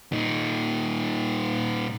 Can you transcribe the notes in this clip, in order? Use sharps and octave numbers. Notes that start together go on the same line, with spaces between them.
A#2 D#4